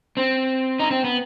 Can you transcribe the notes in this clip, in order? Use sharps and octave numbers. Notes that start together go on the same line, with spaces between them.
C4
D#4
C4
B3